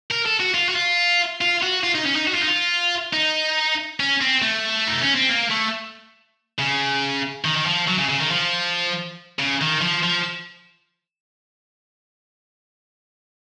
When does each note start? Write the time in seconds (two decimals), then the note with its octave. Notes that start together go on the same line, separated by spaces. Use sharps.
0.11 A#4
0.26 A4
0.40 F#4
0.54 F4
0.69 F#4
0.76 F4
1.41 F4
1.63 F#4
1.84 F4
1.95 D#4
2.06 C#4
2.16 D#4
2.27 F#4
2.35 F4
2.41 D#4
2.48 F4
3.13 D#4
4.00 C#4
4.21 C4
4.42 A3
4.88 D#4
5.01 C#4
5.15 C4
5.29 A#3
5.51 A3
6.59 C#3
7.44 D#3
7.56 D#3
7.66 F3
7.88 F#3
7.98 C#3
8.09 C#3
8.20 D#3
8.31 F3
9.39 C#3
9.61 D#3
9.81 F3
10.04 F3